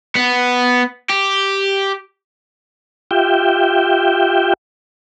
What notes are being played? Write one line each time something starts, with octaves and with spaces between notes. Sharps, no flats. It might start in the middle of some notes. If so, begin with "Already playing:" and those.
B3
G4
F4 G4 E5 G5